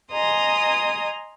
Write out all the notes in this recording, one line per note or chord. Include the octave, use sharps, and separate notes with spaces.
D#5 G#5 A#5 C6 D#6